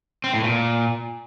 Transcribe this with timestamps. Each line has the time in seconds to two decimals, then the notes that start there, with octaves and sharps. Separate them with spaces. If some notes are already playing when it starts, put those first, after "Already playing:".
0.24 C4
0.34 A2
0.43 A#2